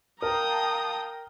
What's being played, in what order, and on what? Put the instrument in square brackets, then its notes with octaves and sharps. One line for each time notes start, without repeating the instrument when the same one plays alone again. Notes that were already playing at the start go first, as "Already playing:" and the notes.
[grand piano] A#4 [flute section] F5 A5 [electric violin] G5 A#5 [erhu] D#6